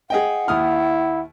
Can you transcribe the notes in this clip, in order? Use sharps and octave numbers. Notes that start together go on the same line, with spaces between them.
G#4 D#5 F#5 G5
D#2 E4 D#6 F6